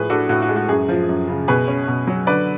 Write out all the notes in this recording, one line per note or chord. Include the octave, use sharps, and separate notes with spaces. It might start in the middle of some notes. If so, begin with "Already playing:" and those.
Already playing: A2 F3 G#4 B4
D4 F#4 A4
A2 F#4
F#4
G#3
F#4
F#2 G#4
F3
F#2
C#3
B2 G#4 B4
C#4
B2
F#3
D3 B4 D5